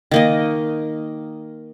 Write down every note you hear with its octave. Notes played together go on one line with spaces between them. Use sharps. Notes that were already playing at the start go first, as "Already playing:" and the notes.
D#3 A#3 D#5